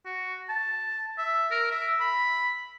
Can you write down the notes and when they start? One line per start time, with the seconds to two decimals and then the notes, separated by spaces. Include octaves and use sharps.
0.05 F#4
0.49 A5
1.18 E5
1.51 A#4
1.71 E5
2.00 B5